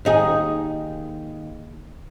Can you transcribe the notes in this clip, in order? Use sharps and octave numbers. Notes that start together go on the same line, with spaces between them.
D#2 D#4 G#4